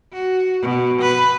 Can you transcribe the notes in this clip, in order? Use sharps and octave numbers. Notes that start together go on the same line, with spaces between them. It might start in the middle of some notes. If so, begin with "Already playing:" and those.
F#4
B2
B4